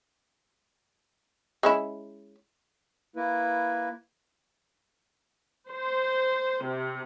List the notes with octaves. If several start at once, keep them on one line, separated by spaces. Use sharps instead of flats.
G#3 C#4 E4
A#3 E4 B4
C5
C3